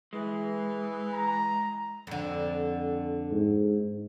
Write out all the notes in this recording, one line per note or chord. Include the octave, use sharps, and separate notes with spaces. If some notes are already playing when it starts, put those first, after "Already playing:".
E3 G#3
A#5
F2 D3
G#2